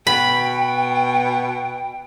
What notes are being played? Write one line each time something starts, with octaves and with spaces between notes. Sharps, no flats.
B2 G5 B5